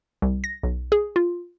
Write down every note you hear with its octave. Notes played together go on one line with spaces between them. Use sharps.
C2
A#6
B1
G#4
F4